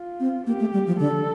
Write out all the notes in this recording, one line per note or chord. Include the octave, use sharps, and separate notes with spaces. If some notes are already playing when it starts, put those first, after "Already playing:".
Already playing: F4
C4
A#3 G4
A3
G3
F3
D3 A4